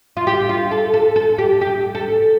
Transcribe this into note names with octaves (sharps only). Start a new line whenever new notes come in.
F4
G4
F4
A4
A4
A4
G4
G4
A4